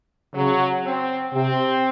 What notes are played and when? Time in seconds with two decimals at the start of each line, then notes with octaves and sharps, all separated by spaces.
0.35 C#3 F#3
0.84 C4
1.34 C3 C4